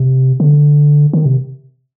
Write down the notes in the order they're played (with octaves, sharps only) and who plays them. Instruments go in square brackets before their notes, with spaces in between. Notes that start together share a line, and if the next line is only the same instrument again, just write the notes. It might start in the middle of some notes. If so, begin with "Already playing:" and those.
Already playing: [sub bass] C3
D3
D#3
C3